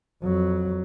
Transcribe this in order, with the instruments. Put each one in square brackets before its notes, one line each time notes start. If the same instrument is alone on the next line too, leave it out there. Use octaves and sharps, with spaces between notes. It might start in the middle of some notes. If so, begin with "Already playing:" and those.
[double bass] F2 F#3